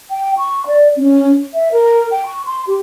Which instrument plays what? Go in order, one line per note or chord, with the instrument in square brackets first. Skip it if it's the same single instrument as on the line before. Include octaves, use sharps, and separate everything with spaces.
[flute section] G5
C#6
D5
C#4
E5
A#4
G5
C#6
C6
G4